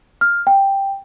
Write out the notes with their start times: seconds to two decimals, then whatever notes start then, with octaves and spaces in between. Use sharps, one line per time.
0.21 F6
0.47 G5